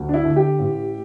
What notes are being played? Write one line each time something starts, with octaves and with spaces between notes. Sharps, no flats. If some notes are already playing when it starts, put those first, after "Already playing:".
Already playing: D2
D4
E4
D3
G4
A1